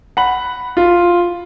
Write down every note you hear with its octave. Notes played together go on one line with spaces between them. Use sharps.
F#5 B5 F#7
F4